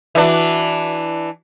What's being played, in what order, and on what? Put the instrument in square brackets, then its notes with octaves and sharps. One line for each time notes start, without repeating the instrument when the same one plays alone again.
[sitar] E3 D4 [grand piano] F#4 B4 E5